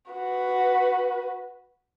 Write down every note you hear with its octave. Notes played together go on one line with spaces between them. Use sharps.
F#4 B4